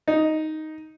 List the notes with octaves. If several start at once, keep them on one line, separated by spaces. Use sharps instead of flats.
D#4